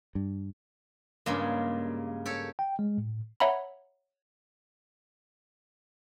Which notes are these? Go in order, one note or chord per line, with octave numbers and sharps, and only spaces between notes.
G2
G2 C#3 G#3 A#3
G4 A4 C#5
G5
G#3
A2
C#5 E5 F#5 A#5 B5